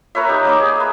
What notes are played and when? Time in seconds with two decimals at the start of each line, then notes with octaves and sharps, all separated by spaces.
0.15 A#4 B4 C#5 E5
0.29 D#4 G4
0.45 A#3 D#4 D6
0.60 G#4
0.76 B4 E5